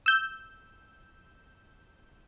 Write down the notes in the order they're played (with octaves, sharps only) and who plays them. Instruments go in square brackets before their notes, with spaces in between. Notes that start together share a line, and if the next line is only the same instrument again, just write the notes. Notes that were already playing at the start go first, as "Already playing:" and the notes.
[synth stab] E6 G6